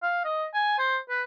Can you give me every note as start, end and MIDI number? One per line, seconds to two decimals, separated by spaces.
0.02 0.23 77
0.25 0.46 75
0.54 0.77 80
0.79 0.97 72
1.09 1.23 71